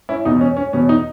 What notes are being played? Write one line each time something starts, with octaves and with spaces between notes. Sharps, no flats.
C#4 E4
E2 B2 D#4
C#4
C#4
E2 B2 C#4
D#4